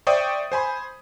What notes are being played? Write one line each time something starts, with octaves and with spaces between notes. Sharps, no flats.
C5 D5 E5 G5 C#6 D#6
C5 G#5 B5 C6